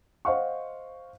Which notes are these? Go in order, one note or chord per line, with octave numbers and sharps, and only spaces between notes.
C5 D#5 F5 F#5 C#6